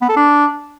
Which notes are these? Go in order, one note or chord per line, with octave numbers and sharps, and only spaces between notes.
B3
A4
D4